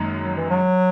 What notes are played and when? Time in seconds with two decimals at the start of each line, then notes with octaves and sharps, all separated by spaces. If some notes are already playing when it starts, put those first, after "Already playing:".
Already playing: F#1 F#2 D#3 G#3
0.25 F#3
0.37 E3
0.50 F#3